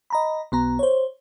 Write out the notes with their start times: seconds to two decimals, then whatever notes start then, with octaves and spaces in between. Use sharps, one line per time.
0.10 D#5 A#5 B5
0.52 B1 B3 A#5
0.79 C5 C#5